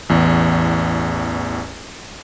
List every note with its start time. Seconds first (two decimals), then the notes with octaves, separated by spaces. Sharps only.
0.09 A1 E2